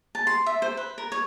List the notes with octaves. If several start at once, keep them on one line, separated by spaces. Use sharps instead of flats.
A5
C6
E5
C5
B4
A#4
C#5